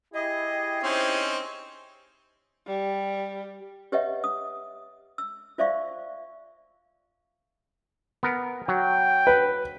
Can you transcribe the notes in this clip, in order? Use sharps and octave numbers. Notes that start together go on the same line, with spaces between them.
E4 G4 G#4 D#5
C4 C#4 D#4 C5
G3
G4 B4 C#5 D#5 E5 F#5
D#6
E6
F4 C5 D5 E5 F5 C#6
B3 A#4
F#3 G5
B4